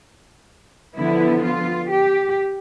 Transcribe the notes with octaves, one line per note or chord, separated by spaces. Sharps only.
D3 F3 B3 E4
F4
G4